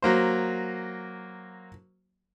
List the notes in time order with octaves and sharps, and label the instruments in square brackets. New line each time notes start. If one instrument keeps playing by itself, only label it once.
[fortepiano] F#3 A#3 C5